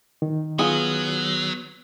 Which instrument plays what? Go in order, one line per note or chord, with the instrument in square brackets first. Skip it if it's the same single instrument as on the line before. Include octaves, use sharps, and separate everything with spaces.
[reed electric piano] D#3
[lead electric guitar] F#3 [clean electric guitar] B3 [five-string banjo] F4 G#4